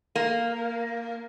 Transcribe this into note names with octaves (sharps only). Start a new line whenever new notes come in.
A#3